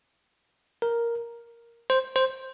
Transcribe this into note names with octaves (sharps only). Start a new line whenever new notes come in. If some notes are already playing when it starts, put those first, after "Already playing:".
A#4
C5
C5